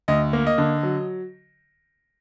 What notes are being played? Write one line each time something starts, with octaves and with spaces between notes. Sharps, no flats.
D2 D#5
A#3
D#5
D3
F#3